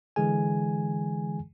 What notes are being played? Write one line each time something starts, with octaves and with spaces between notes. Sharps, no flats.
D3 E3 G#3 G#4 G#5